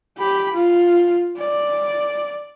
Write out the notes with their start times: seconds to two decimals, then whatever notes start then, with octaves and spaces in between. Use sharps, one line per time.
0.18 G4 B5
0.54 F4
1.38 D5